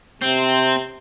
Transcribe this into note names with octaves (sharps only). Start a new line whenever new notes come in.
C3 C4